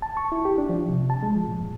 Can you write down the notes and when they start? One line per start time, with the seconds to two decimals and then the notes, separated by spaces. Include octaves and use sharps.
0.02 A5
0.17 C#6
0.32 E4
0.45 G4
0.58 D4
0.69 F3
0.89 C3
1.10 A5
1.23 G#3
1.36 F3
1.48 A#2
1.59 G2